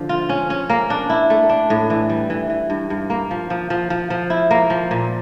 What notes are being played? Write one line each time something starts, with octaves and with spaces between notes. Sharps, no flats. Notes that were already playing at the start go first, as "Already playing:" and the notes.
Already playing: D3 F3
F4
C#4
C#4
A#3
D4
E4
A3
D4
A2
E3
G3
E3
E3
G2
G2
A#3
F3
F3
F3
F3
F3
E4
A#3
F3
A#2